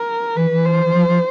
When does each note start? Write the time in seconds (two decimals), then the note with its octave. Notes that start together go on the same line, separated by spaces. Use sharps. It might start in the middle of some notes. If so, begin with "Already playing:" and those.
Already playing: A#4
0.36 E3 B4
0.51 E3
0.65 C5
0.86 E3
0.94 F3
1.08 F3